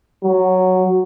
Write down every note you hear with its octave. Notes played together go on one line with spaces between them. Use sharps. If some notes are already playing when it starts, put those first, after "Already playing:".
F#3